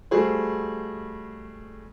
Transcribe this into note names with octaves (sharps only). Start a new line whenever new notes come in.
G3 A3 F#4 G#4 C5